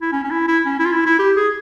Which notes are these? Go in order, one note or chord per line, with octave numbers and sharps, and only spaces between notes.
E4
C#4
C#4
E4
E4
C#4
E4
F4
E4
E4
G4
G#4